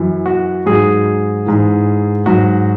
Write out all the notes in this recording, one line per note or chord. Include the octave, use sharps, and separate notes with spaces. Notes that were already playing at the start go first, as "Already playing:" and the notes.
Already playing: F#2 E3
F#4
G#2 F#3 G#4
G#2 E3
G#2 F#3 F#4